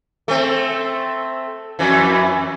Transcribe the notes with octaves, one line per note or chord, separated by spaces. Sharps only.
A3 C4
F2 E3